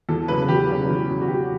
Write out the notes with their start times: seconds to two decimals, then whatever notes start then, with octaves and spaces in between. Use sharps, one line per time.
0.09 E2 A4
0.28 C#3 F#3 C#4 B4
0.48 E2 G4
0.69 C#3 F#3 C#4
0.88 E2
1.08 C#3 F#3 C#4
1.21 F#4
1.28 E2 G4